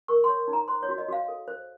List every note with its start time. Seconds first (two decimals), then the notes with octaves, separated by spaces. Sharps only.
0.08 A#4 C#6
0.24 C6
0.28 C#5
0.48 D#4
0.53 A#5
0.68 C5 C6
0.83 C#5
0.89 F#4
0.98 D#5
1.08 F#4 F5
1.28 A4
1.48 C5